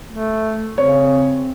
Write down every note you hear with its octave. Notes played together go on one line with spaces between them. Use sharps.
A3
C#3 C4 C#5